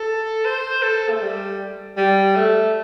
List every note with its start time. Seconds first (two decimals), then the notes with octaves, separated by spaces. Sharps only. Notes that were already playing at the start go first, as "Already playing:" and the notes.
Already playing: A4
0.45 C5
0.83 A4
1.10 A3
1.22 G3
1.97 G3
2.36 A3